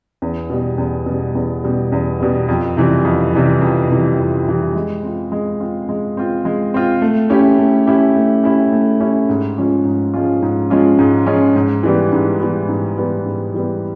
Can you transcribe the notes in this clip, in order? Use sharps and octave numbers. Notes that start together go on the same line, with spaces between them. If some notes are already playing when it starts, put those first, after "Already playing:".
E2
B2 G3
E2
B2 G3
E2
B2 G3
E2
B2 G3
F2
C3 E3 G3
F2
C3 E3 G3
F2
C3 E3 G3
F2
C3 E3 G3
G#3
C4 F4
G#3
C4 F4
G#3
C4 F4
G#3
C4 F4
A3
C#4 E4 G4
A3
C#4 E4 G4
A3
C#4 E4 G4
A3
C#4 E4 G4
G#2
F3 G#3 C#4 F4
G#2
F3 G#3 C#4 F4
G#2
F3 G#3 C#4 F4
G#2
F3 G#3 C#4 F4
G#2
E3 G3 B3
G#2
E3 G3 B3
G#2
E3 G3 B3
G#2
E3 G3 B3